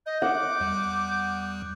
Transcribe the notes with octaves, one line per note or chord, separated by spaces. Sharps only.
D#5 G6
F#5 D6
E2 G3 F#6